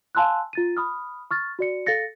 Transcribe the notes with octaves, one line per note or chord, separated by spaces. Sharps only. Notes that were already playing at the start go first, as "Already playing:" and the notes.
F5 G#5 A5 C6 E6 F#6
F4 A6 D#7
B5 D#6 F6
C#6 F6 A6
F#4 D5 C#7
A4 F5 A6 A#6 C#7